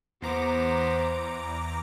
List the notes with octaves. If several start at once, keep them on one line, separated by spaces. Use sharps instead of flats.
E2 B3 C5 A#5 D6